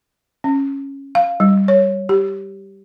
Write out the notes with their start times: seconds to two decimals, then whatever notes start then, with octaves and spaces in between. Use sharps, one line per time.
0.44 C#4
1.15 F5
1.40 G3
1.68 C#5
2.09 G4